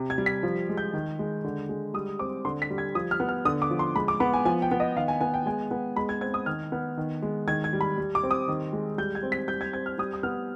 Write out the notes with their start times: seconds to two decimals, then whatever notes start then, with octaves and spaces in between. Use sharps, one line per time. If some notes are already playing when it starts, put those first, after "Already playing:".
Already playing: C3
0.10 G#6
0.18 G3
0.26 B6
0.43 F3
0.69 G#3
0.77 G6
0.94 D#3
1.19 G#3
1.44 D3
1.69 G#3
1.94 G3 D#6
2.19 C4 D6
2.45 D3 C6
2.62 B6
2.70 G3
2.78 G#6
2.95 F3 D#6
3.11 F6
3.20 B3
3.29 F6
3.45 D3 D#6
3.62 D6
3.71 F3
3.79 C6
3.95 G#3 B5
4.08 D6
4.20 B3 B5
4.33 G#5
4.45 F3 G#5
4.62 G5
4.71 B3
4.80 D#5
4.97 D#3 F5
5.08 G#5
5.21 B3 G#5
5.34 G5
5.46 G#3 G#5
5.71 B3
5.96 G#3 B5
6.09 G#6
6.21 C4 G#6
6.34 D#6
6.46 D#3 F6
6.72 B3
6.97 D#3
7.22 G#3
7.48 D#3 G#6
7.64 G#6
7.73 G3
7.81 B5
7.98 G3
8.15 D6
8.23 C4
8.31 D#6
8.48 D#3
8.73 G#3
8.98 G3 G6
9.15 G#6
9.23 C4
9.32 B6
9.48 G3 G6
9.61 G#6
9.73 C4 G#6
9.86 F6
9.98 G3 D#6
10.13 D#6
10.23 B3 F6